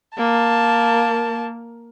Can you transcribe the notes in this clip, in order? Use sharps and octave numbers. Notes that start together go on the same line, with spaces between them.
A#3 A5